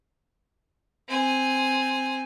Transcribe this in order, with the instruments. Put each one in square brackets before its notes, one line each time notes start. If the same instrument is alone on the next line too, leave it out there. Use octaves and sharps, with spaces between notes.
[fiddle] C4 G#5